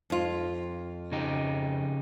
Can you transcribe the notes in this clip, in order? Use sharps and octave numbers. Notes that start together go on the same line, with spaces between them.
F2 F4
C#3 D#4 G4